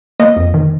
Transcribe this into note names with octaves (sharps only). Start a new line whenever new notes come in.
A#3 D#5
F2
D#3